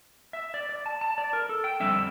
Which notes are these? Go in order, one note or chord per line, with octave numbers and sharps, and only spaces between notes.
E5
D5
D5
A5
A5
D5
A#4
A4
G5
F2 D3 G3 C4 E5